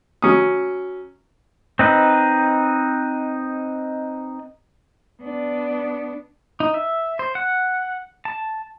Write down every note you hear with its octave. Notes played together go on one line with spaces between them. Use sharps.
F#3 C#4 D#6
C4 D#4 B4
B3 D4
D#4
E5
C5
F#5
A5